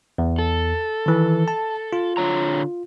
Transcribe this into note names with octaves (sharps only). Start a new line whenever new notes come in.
E2
A4
D#3 E3
A5
F4
D3 C#5 A#5